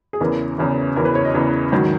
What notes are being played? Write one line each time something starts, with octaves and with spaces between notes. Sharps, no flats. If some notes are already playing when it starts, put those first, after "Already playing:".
G#4
E2 C#3 E3 A#4
E2 C#3 E3
E2 C#3 E3 A#4
B4
C#5
D#5
E2 C#3 E3
G#2 D#3 F#3